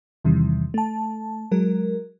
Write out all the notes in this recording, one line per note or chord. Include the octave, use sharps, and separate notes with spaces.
E2 C3 D#3 E3 G3
A3 A5
F#3 G#3 A#4